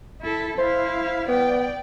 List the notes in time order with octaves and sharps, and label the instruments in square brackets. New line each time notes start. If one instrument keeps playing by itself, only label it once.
[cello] E4 A4
[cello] E4 F5 [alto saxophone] C5
[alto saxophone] B3 [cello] D5 G5